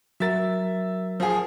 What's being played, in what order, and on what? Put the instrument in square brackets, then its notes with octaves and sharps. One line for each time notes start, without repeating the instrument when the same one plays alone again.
[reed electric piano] F#3 A#4 [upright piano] E5 A6
[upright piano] F3 G#4